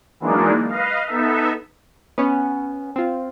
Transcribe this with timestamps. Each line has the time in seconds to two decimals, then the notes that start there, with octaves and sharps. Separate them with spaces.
0.20 E3 F#3 G#3 A#3 D4 D#4
0.68 B4 D#5 F5
1.06 B3 D#4 A4 E5
2.18 B3 C#4
2.96 C4 F4